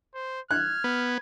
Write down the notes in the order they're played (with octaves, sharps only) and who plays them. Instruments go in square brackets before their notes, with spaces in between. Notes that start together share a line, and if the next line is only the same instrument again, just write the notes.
[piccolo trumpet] C5
[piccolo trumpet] F6 [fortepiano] F#6 [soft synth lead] G#6
[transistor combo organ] B3